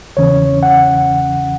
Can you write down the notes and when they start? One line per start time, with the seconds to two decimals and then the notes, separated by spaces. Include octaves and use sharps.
0.17 E2 C#3 E3 C#4 C#5
0.63 F#5